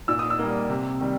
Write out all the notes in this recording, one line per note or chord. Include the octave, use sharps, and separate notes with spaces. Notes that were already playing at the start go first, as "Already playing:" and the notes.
A#2 E6
D#6
E6
G3 A#3
C3
D#3 G3